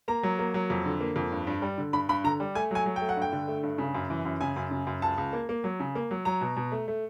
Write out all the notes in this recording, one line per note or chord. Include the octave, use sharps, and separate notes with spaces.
A#3 A#5
F#3
A#3
F#3
F2
D3
A#3
F2
G2
G2
G3
D3
G2 B5
G2 B5
D3 A#5
G3
A3 G#5
F#3 G#5
F#3
G5
A3
F#5
G2 G5
D3
A3
G2
C#3
F#2
E3
F#2
C#3 G#5
F#2
C#3
F#2
C#2 A5
C#2
A#3
A#3
F#3
C#3
A#3
F#3
F#3 A#5
B2
B2
A3
A3